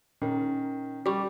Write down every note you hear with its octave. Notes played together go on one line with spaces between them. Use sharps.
A#2 D#3 C#4 A#4
G3 C#6 D6